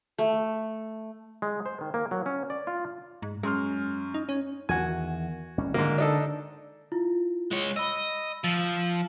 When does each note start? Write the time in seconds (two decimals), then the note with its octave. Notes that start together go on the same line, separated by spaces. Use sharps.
0.19 A3
1.42 G#3
1.66 C5
1.81 D#3
1.94 A#3
2.11 F#3
2.26 C#4
2.50 D5
2.67 F4
3.22 G#2
3.43 F#2 G#3 C6 F6
4.14 D#4
4.29 C#4
4.69 E2 D#3 F#4 G#5
5.58 G#1 G3 C#4
5.74 G#2 D3 A#3
5.98 D4 D#4 A4
6.92 E4 F4
7.51 G#3 C#5
7.76 D#5 B5 E6
8.44 F3 E6 A6